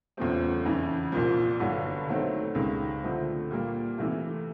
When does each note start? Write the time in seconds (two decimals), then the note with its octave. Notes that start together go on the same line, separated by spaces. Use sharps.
0.17 E2 C#3 F3 A3 C4
0.65 F2 C#3 E3
1.12 C2 A#2 F3
1.60 G1 G2 D3 F#3
2.08 D#3 F#3 A3 C4
2.55 C#2 C3 D#3 G#3
3.02 D3 F3 A3 C4
3.51 A#2 G3 A#3
3.98 C3 E3 A3